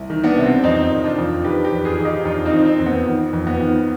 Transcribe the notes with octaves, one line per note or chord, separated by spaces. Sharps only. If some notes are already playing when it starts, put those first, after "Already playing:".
Already playing: C2
D#3
B3 D4
C3
C4
F2 C4 D#4
D#3
D4 F4
F2
D#3 G4 B4
G4 B4
F2
F4 G#4
D#3 G#4
D#4 G4
F2 D4 F4
C4 D#4
D#3
C4
F2
B3
D#3
F2
B3
D#3